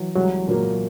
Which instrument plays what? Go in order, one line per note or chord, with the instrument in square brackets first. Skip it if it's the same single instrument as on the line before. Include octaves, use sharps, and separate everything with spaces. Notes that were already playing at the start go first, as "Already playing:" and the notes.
Already playing: [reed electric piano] E3 F#3
[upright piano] C2 [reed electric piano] F#3 G#3
[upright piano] A#2 F#3 A#3